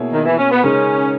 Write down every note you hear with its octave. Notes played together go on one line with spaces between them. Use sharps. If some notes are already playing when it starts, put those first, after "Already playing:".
Already playing: B2 A#3 E4 G#4 C#5
D#3
E3
C#4
B3
C#3 G#3 C#4 D#4 A#4